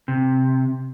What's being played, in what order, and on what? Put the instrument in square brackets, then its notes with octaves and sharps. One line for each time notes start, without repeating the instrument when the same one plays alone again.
[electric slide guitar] C3